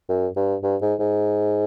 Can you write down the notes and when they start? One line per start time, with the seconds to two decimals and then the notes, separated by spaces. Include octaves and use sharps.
0.09 F#2
0.36 G2
0.63 G2
0.82 G#2
0.99 G#2